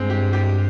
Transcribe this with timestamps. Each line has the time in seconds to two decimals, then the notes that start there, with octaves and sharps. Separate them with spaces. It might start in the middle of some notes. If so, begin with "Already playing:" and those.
Already playing: G2 G#3 C4
0.10 G4
0.33 G4